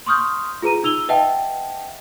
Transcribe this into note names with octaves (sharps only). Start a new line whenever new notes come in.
C6 C#6 D#6 F6 G6
F4 G#4 B4 A#5 D#7
D#4 E6 F7 G7
B4 D#5 E5 F#5 G5 A5